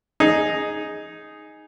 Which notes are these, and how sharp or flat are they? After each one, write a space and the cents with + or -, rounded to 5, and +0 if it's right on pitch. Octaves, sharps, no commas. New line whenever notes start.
D#4 +0 G#4 +0